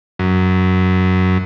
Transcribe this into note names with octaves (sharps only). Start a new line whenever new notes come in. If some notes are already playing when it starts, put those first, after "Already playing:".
F#2